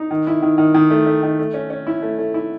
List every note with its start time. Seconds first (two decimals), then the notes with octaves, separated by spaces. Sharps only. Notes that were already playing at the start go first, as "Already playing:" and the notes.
Already playing: D#4
0.11 D#3
0.27 E4
0.42 D#3
0.58 D#3
0.74 D#3
0.90 A3
1.06 A3
1.23 D#3
1.39 A3
1.54 C#4
1.70 C#4
1.87 E4
2.02 A3
2.18 A3
2.34 E4